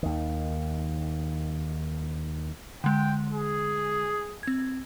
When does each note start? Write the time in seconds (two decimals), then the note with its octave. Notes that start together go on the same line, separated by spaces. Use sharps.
0.03 D#2 D#3
2.84 D3 G#3 G5
3.32 G#4
4.43 C4 G#6